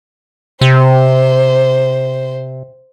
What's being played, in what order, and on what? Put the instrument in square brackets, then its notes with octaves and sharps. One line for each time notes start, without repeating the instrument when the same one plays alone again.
[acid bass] C3 [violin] C5